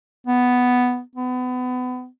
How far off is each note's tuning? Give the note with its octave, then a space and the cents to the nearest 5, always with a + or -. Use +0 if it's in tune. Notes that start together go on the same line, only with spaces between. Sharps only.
B3 +5
B3 +30